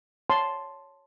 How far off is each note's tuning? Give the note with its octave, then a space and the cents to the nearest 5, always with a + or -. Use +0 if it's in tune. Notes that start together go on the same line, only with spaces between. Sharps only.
C#5 +0 A5 +0 C6 +0